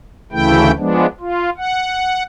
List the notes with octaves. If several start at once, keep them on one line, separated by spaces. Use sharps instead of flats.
D2 C#3 E3 A3 E4 G5
F3 G#3 B3 D4
F4
F#5